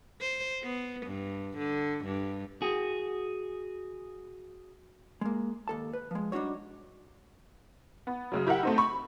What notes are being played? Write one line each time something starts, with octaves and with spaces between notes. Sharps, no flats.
C5
B3
G2
D3
G2
F#4 G#4
G#3 A#3
D#2 A4 A5
B4
F3 G#3
G3 D4 D#4 F#4 C#5
B3
F#2 C#3 F#3
E4 G4 A#4 E5 F#5
A3 C4 D#4
B5 C#6